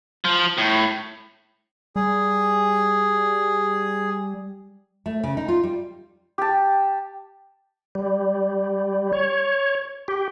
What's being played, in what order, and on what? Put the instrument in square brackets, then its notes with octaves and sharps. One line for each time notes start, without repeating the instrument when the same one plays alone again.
[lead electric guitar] F3
A2
[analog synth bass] G3 [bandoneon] G#4
[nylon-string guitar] A3
C#3
D#4
F4
G3
[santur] G4 A5
[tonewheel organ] G3
C#5
G4